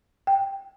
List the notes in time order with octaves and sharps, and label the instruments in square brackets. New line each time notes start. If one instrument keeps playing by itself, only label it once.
[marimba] G5